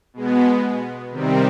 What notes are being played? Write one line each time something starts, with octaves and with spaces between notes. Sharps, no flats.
B2 G#3 B3
C3 D#3 G3 C4